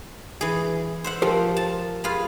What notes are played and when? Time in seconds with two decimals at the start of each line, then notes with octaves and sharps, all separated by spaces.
0.41 E3 G#4
1.04 C5 E5 F#5
1.22 F3 G4 A#4 C5
1.57 A5
2.04 F4 G#4 B4